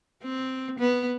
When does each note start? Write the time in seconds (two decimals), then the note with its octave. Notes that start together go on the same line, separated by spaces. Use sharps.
0.23 C4
0.79 B3